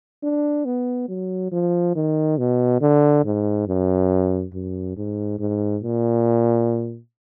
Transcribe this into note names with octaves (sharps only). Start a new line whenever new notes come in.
D4
B3
F#3
F3
D#3
B2
D3
G#2
F#2
F#2
G#2
G#2
A#2